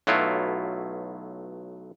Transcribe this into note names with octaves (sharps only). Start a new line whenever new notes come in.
B1 F#3 A3 B3 E4 F4